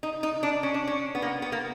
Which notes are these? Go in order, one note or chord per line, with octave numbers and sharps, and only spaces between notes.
D#4
D#4
D4
C#4
D4
C#4
B3
A#3
B3
A#3